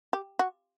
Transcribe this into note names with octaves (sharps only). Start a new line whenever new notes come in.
G4
F#4